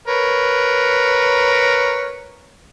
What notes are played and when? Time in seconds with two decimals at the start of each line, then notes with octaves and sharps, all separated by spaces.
0.08 A#4 B4 C#5